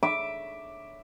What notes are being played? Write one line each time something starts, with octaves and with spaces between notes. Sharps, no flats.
E5 D6